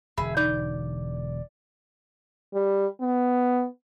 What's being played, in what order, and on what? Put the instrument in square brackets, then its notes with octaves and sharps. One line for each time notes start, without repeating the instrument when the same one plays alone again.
[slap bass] E1 D3 [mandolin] G#4 E5 [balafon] B5
[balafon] D#4 [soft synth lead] D5 [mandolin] G6
[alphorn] G3
B3